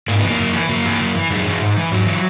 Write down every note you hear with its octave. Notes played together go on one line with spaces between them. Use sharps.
G#2 A#3
B3
E3 A#3
F#2
E3
F#2 A#3
E3
F#2
E3
F#2 G#3
E3
G#2
E3
G#2 F#3
E3